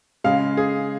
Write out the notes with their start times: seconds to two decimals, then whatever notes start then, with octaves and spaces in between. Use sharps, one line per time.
0.24 C#3 G#3 F5
0.57 G#4